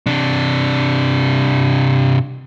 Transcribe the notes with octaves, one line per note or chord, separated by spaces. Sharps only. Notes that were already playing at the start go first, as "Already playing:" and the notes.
C3 D4